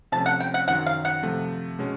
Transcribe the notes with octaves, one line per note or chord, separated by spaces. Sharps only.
C3 F3 A3 C#4 A5
F#5
G5
F#5
F#2 D#3 F#3 F#5
F5
F#5
C3 F3 A3
B2 G#3 C#4